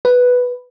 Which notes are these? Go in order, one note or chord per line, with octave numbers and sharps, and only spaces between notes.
B4